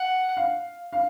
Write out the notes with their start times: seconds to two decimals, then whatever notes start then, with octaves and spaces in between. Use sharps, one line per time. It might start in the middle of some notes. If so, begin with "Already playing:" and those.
Already playing: F#5
0.37 F5
0.93 F5